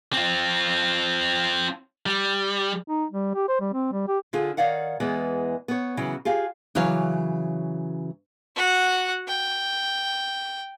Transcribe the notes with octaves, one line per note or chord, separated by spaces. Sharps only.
C4 F4
G3
D#4
G3
G4
C5
G3
C4
G3
G4
D3 F4 G#4
D#3 C#5 D5 F5 F#5
E2 E3 G#3 B3
B3 C#5
C#3 E3 F#3
F4 G4 G#4 F5
C#3 E3 F#3 C#5 F5
F#4 F#5
G5